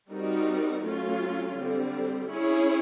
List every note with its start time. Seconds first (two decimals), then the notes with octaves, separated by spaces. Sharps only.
0.12 G3 C4 D#4 F#4 A#4
0.85 F#3 A3 C#4 F4
1.57 D3 G3 C4
2.30 C#4 E4 G#4 C#5